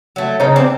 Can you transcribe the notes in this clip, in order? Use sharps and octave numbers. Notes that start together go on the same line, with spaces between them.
F#3 A3
C#3 C#4 D#4
C4 D4